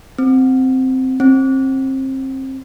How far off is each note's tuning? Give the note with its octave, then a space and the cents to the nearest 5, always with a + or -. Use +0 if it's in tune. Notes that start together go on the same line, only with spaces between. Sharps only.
C4 -5
C4 +30